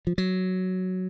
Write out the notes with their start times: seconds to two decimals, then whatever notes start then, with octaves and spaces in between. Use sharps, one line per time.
0.07 F3
0.18 F#3